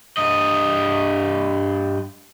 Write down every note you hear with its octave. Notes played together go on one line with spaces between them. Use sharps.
G2 D#5